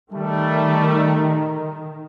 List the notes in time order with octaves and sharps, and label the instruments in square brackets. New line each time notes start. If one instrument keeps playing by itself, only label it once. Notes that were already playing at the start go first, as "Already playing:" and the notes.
[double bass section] D#3 [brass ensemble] G3 A3